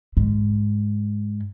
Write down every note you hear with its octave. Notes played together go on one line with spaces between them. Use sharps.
G#2